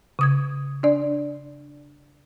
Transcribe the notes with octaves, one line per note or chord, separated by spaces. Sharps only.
C#3 D#6 G#6
D4 D5